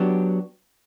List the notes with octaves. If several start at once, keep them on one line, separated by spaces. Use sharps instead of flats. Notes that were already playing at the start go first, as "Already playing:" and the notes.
Already playing: F#3 B3 D4 G4